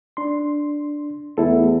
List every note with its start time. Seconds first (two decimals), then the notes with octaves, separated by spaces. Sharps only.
0.17 D4 C6
1.38 E2 A3 E4 A4